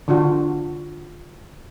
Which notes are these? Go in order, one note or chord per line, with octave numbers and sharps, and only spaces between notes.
D3 D4 F4 F#4